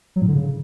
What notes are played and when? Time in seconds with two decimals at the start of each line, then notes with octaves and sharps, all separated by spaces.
0.16 F#3
0.22 A2
0.28 D3
0.34 C#3